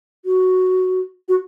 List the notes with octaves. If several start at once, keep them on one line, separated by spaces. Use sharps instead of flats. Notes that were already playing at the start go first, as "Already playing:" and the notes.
F#4
F#4